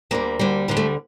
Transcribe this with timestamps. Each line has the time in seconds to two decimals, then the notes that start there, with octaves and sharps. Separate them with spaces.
0.11 D2 D3 G3 A#3
0.39 D2 D3 G3
0.68 D2 D3 G3 A#3
0.77 A3